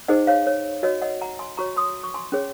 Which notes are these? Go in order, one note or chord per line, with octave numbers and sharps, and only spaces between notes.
D#4 G#4 C5 D#5 F#5
C#5 F5
C#5
F#4 C#5 D#5
D#5 F#5
F#5 A#5
G#5 C6
F#4 C#5 A#5 C#6
C6 D#6
C#6
G#5 C6
C#4 G#4 C#5